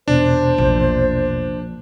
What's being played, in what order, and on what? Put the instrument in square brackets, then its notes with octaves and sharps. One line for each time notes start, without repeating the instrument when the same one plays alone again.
[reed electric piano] E2 B2 [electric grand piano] D4 [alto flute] C5
[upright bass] A#1